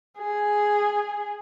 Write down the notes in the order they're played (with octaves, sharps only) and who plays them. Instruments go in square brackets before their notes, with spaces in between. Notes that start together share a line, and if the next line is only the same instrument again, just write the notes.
[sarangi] G#4